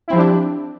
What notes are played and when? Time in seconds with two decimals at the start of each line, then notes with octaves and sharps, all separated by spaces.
0.08 E4
0.10 C4
0.13 F3
0.16 G4
0.18 D4